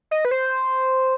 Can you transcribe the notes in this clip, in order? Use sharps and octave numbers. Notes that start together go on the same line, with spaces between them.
D#5
B4
C5